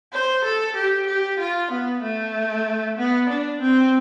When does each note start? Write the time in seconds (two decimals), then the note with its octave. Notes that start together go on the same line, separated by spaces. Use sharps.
0.12 C5
0.44 A4
0.76 G4
1.07 G4
1.39 F4
1.71 B3
2.02 A3
2.98 B3
3.29 D4
3.61 C4